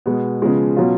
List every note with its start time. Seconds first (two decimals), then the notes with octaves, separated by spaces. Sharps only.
0.06 B2 G#3 B3
0.41 C#3 F3 G#3 B3
0.76 B2 F#3 C#4 F4